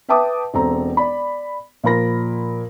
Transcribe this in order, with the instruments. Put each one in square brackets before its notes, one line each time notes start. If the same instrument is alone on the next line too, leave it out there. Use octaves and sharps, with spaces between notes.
[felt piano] B4 E5 G5 A5 D6 D#6
E1 C4 A4 A#5
D5 B5
A#2 F3 A#4 B5 A#6